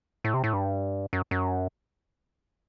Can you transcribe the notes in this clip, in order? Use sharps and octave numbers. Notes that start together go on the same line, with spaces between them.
A2
C3
A2
G2
F#2
F#2